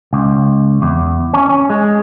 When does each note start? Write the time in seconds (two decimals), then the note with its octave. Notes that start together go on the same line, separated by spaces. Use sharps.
0.13 C#2
0.82 E2
1.34 C#4
1.49 C#4
1.70 G#3